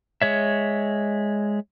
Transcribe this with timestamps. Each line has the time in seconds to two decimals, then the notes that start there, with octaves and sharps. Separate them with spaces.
0.22 G#3 C#5 E5